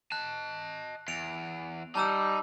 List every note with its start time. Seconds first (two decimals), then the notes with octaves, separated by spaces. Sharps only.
0.12 D#5 A5 F#6
1.08 E2 D7 F7
1.95 G3 D#4 A5 A#5 E6